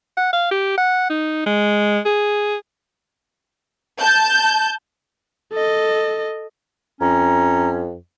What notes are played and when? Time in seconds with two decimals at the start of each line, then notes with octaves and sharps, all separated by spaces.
0.17 F#5
0.33 F5
0.51 G4
0.78 F#5
1.10 D#4
1.47 G#3
2.06 G#4
4.01 A5 G6
5.53 A4 D#5
7.01 F2 C#4 A#5